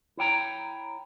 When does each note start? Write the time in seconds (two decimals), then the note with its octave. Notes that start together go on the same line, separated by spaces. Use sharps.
0.17 E4 C#5 G5 A#5